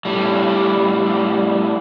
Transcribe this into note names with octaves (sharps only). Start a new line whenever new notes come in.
A2 G3